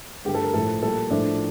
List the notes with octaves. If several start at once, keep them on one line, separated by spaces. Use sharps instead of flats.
G2 D3 A3 G4
A4
A#4
A2 F3 A3 A4
A#2 G3 A4
A2 F3 A3 D4